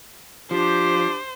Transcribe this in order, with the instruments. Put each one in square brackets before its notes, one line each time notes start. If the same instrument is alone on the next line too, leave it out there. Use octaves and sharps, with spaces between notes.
[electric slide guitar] F3 [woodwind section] D4 G4 [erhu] C5